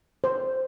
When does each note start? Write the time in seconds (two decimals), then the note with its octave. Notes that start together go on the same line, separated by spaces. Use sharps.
0.24 C5